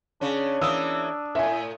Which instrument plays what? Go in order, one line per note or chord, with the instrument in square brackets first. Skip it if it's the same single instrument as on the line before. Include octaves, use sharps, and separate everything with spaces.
[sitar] C#3 C#4 [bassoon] D4
[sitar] E3 A#3 [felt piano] D#6 E6
[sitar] A2 [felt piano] E5 G#5